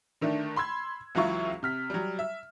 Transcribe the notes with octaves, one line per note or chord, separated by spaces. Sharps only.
D3 D#3 A3 D4
B5 C6 E6 G#6
C#2 E3 F#3 E4 F4 C#6
C3 F6 B6
F#3 G3
E5